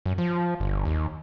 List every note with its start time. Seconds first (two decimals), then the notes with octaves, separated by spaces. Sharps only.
0.06 F#2
0.18 F3
0.60 G1
0.85 D#2